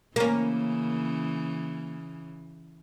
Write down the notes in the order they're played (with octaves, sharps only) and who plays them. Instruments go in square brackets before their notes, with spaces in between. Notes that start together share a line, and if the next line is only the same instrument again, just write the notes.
[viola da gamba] C#3 E3 [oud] A#3 C#4